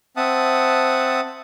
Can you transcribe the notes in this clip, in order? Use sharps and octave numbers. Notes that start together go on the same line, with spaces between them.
C4 E5 F#5 A5 D#6